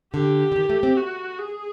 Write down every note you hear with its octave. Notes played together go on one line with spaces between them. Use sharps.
D3 G4
D3
D#3
A3
C4
F#4
G#4